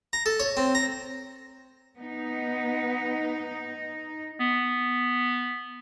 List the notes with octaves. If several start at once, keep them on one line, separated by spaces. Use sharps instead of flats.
A#5
A4
C#5
C4
A#5
B3 D#4
B3